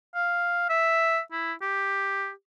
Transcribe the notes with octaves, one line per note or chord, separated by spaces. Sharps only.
F5
E5
E4
G4